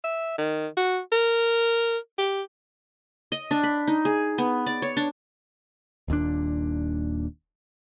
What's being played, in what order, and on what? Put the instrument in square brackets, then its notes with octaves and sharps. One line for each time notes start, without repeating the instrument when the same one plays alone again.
[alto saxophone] E5
D#3
F#4
A#4
G4
[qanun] D#5
D4
B5
D#4
G#4
B3
D5
C#5
D4
[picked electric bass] D#1 D#2 A#2 D4